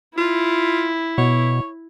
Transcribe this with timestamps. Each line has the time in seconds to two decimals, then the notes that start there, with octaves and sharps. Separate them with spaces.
0.18 E4 F4
1.18 B2 C#5